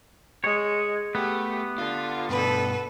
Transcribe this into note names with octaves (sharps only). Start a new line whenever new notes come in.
G#3 C#5
A3 B3 G4
D3 F4
G2 B2 A4 B4